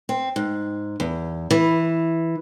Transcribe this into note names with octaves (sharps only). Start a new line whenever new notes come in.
C4
G#2
E2
E3